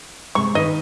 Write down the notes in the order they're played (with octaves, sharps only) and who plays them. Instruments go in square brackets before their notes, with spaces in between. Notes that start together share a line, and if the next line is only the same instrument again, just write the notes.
[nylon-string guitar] C3 G#3 [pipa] C#6
[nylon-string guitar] D#3 D#4 B4 [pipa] D#5